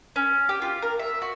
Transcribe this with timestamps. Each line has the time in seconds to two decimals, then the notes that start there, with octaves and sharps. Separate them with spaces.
0.16 C#4
0.49 G4
0.62 F4
0.82 A#4
0.99 E5
1.22 F#4